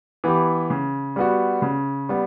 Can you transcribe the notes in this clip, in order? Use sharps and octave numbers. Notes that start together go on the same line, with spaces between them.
E3 B3 E4 G4
C#3
G3 B3 F#4
C#3
G3 B3